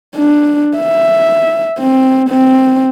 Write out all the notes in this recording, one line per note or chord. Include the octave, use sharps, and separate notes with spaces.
D4
E5
C4
C4